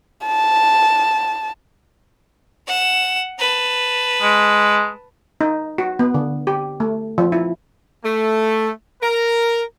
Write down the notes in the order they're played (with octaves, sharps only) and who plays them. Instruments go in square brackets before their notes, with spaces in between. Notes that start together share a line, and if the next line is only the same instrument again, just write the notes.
[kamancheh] A5
[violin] F#5 E7
B4 A5
[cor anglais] G#3
[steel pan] D#4
F#4
B3
D3
G4
A3
F3
E4
[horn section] A3
A#4